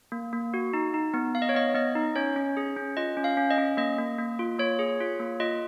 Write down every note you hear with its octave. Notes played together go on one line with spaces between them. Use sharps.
A#3
A#3
F#4
D#4
D#4
B3
B3 F5
D#5
C#5
B3 D#5
B3 D#5
D#4
C#4 C#5
C#4
G#4
C#4
F4 D#5
C#4
F5
C#4
D#5
C#4
A#3 D#5
A#3
A#3
F4
A#3 C#5
G#4
F4
A#3
F4 D#5